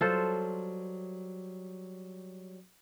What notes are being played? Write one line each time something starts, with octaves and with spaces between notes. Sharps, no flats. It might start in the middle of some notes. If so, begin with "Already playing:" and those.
F#3 G3 F4 A4 C5